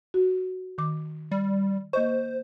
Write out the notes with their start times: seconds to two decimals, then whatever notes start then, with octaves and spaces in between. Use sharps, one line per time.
0.14 F#4
0.78 D#3 D6
1.31 G3
1.93 A#3 C5 D#5 C#6